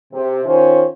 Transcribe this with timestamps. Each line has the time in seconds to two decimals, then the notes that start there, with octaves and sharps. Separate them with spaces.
0.13 C3
0.45 D#3 C#4 F4 C5